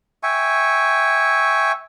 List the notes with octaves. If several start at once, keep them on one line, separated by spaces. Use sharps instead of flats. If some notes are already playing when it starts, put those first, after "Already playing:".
E5 G5 G#5 C#6